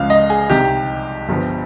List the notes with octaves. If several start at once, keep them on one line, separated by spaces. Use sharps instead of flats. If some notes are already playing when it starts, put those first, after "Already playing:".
Already playing: C#2 C#3 F3 F5
D#5
G#4
C2 C3 D#3 G4
G1 G2 F3